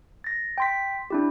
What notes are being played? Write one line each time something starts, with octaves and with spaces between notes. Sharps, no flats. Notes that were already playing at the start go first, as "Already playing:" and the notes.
A6 A#6
G5 C6 B6
D4 E4 G4